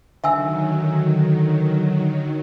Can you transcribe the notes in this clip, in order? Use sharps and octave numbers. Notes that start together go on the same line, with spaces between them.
D3 D#3 F#3 E5 G#5 E6